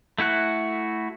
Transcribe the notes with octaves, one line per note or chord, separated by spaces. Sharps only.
A3 E4 F#4 F#6